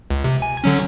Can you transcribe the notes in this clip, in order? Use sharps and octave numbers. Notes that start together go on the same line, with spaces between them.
C#2
C3
G#5
D3 F#3 C#4